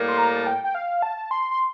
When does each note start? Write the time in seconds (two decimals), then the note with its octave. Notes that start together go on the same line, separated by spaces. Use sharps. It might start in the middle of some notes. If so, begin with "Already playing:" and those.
Already playing: A2 G3 A#3
0.08 C6
0.18 A#5
0.36 A5
0.47 G5
0.64 G5
0.75 F5
1.02 A5
1.31 C6
1.51 C6